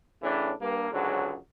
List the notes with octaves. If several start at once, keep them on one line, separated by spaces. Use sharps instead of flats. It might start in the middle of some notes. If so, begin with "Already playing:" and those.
A2 C#3 E3 D4
G2 A#3
C#2 G#2 D3 F#3